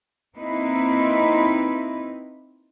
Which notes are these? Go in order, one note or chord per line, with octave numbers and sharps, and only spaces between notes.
A#3 C4 D#4 E4 B4